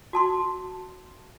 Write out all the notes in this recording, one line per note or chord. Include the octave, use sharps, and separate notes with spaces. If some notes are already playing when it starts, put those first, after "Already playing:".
F#4 A5 C6